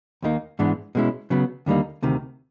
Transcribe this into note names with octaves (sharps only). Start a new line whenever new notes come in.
D#2 D#3 G3 A#3 D#4
G#2 E3 G#3 B3 D4
B2 G#3 C#4 E4
C#3 F#3 B3
D#2 D3 G3 A#3 D#4
D2 C3 D#3